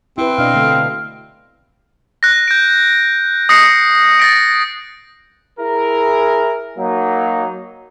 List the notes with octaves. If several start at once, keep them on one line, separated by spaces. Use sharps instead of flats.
C4 E4 B4
B2 D4 D#5 F5
D3 A3
F#6 A#6
G6 D7
D#6 A#6 C7 C#7
A6 A#6 D7
E4 G#4 A#4
F#3 A#3 D#4